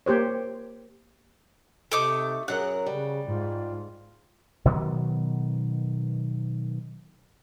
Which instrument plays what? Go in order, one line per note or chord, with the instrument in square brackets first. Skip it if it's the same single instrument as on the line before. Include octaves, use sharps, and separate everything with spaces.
[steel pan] A#3 G4 C5 C#5
[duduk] C3 [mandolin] A3 D#4 D6
[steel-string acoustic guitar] F#2 F#3 A#4 [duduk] G#4 [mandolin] F#5
[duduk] C#3 [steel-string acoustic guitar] G3
[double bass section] G#2 [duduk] F4
[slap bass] B2 D#3 F#3 B3